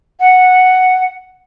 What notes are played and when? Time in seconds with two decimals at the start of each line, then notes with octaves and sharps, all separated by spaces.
0.20 F#5